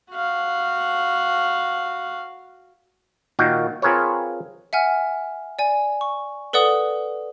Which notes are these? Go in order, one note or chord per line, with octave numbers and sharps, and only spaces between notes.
F#4 F5
A#2 D#3 F#4 F5 G5
C4 F4 G#4 A#4 B4 C#5
E5 F#5 G#5 F6
D5 G#5
C#6
A4 B4 D5 F#5 D#6